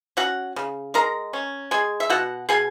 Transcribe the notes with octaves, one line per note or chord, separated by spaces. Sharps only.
C#4 F#4 F#5
C#3
G#3 A#4 A#5
C#4
G#3 G#4 G#5
E5
B2 F#4 F#5
B2 G#4 G#5